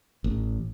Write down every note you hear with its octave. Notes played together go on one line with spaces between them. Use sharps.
A1